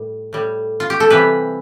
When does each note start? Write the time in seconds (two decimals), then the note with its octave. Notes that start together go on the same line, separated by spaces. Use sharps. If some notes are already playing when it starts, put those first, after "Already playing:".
Already playing: A2 G3
0.33 A2 G3
0.80 F4
0.90 G4
1.00 A4
1.10 C3 E3 G3 B4